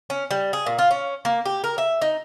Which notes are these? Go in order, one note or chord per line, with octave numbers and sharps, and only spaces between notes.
C#4
G3
G#4
A#2
F4
C#4
A#3
G4
A#4
E5
D#4